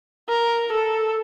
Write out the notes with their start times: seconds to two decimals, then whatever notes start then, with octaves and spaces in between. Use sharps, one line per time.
0.29 A#4
0.72 A4